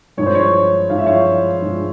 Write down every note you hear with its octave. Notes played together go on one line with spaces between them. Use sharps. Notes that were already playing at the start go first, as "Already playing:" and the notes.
G2 F3 G#3 C#5
C5
C#5
G2 F3 G#3 F5
E5
C#5 F5
G2 F3 G#3